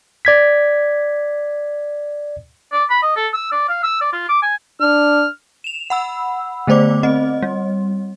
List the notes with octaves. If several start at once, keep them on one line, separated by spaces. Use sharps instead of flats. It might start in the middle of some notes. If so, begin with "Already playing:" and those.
D5 G#6 B6
D5
B5
D#5
A4
E6
D5
F5
E6
D5
F4
D6
G#5
D4 F6
E7 F7
F#5 B5 E6
D3 A3 B3 C5 D5 D6
C4 D#5
G3